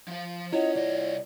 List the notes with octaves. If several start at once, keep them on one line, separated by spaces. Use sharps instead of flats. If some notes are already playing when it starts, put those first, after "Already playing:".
F3 F5
C#4 E4 F4 C#5 D#5 F#5
C2 D5 D#5